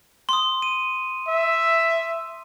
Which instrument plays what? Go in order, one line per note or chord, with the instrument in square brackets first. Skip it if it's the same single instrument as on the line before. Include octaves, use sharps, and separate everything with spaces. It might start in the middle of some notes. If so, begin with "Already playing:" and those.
[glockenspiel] C6 D#6
D#7
[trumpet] E5